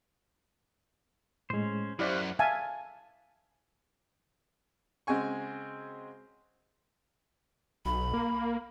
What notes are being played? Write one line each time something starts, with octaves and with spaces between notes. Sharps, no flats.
A2 G#3 C#4 C5
F#2 E4 F#4 G4 C5 D5 F5 F#5
E5 F5 G#5 A5
C#3 G#3 C4 F#4 G#5 C#6
B1 B5
A#3